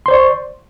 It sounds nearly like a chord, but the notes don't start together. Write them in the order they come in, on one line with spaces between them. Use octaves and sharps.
C6 C5 D5 C#6